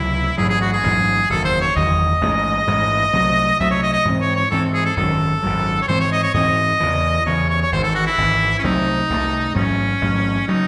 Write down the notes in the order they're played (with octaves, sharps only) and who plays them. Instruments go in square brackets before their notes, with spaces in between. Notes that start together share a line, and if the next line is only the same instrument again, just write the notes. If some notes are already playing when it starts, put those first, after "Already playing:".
Already playing: [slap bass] C#2 C3 F#3 A3 [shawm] E4
[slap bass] A1 G#2 F#3 [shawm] G#4
[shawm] G#4
F#4
G#4
[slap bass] A1 G#2 F#3
[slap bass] F#1 E2 D#3 [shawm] A4
[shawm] C5
C#5
[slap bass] F#1 E2 D#3 [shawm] D#5
[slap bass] A1 G#2 E3 G#3
A1 G#2 E3 G#3
C2 C3 F#3 A3
[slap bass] C2 C3 F#3 A3 [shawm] E5
[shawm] C#5
D#5
D#5
[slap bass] G#2 E3 C4
[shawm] C#5
C#5
[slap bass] G#2 E3 C4 [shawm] A4
[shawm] G#4
A4
[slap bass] G#1 F#2 D#3 F#3 [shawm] A4
[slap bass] G#1 F#2 D#3 F#3
[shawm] C#5
[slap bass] G#2 E3 C4 [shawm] C5
[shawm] C#5
D#5
C#5
[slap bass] G#2 E3 C4 [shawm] D#5
[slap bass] E2 C#3 E3
[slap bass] E2 C#3 E3 [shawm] C#5
[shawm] C#5
C#5
[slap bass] G#1 G#2 E3 [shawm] C5
[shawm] A4
F#4
E4
[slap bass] G#1 G#2 E3
[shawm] C#4
[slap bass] C2 C3 F#3 A3 [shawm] D#4
[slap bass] C2 C3 F#3 A3
[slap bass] A1 G#2 F#3 A3 [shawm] C#4
[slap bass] A1 G#2 F#3 A3
[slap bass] C#3 F#3 [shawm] D#4